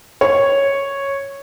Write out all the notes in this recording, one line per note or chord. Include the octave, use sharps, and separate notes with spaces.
C#5